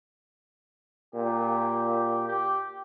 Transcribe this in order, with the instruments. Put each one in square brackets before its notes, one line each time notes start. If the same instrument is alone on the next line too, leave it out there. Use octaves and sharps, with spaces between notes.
[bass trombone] A#2 [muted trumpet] G4
[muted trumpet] G4